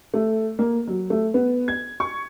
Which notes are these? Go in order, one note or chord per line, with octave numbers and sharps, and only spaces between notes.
A3
A#3
F#3
A3
B3
G#6
C#6